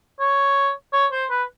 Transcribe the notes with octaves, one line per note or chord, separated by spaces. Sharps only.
C#5
C#5
C5
B4